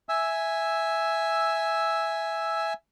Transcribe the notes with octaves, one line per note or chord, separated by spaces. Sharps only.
E5 G#5 E6